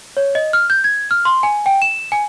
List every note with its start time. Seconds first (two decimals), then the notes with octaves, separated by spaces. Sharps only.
0.17 C#5
0.35 D#5
0.53 F6
0.70 G6
0.84 G#6
1.11 F6
1.25 C6
1.43 G#5
1.66 G5
1.82 E7
2.12 G#5